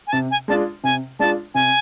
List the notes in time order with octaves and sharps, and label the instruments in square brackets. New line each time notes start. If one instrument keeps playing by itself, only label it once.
[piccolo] G#5
[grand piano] C3 [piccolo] A5
[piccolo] G#5
[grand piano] G#3 D4 F4 [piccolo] A5
[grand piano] C3 [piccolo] G#5
[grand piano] G#3 D4 F4 [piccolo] A5
[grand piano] C3 [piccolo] G#5